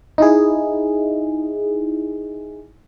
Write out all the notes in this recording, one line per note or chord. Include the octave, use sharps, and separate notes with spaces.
D#4 E4 G#4